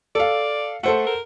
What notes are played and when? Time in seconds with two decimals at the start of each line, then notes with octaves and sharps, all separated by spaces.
0.15 A4 D5 F5
0.83 A3 A4 C5 F#5
1.07 A#4